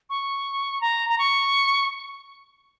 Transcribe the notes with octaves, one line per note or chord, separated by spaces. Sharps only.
C#6
A#5
A#5
C#6